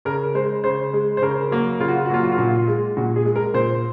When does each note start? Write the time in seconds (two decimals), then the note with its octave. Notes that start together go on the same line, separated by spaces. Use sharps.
0.05 C#3 A#4
0.34 G#3 C5
0.64 C#3 C5
0.93 G#3
1.17 C5
1.22 C#3 A#4
1.51 F#3 A#3
1.80 C#3 F4
1.88 F#4
1.98 F4
2.05 F#4
2.09 F#3 A#3 F4
2.23 F#4
2.32 F4
2.38 A#2 F#4
2.49 F4
2.68 G#3
2.97 A#2 F#4
3.16 G#4
3.25 G#3
3.36 A#4
3.54 A#2 C5